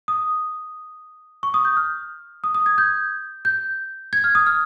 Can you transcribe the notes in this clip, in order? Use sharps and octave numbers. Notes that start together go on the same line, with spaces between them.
D#6
C#6
D#6
G6
F6
D#6
D#6
G#6
G6
G6
G#6
F6
D#6
F6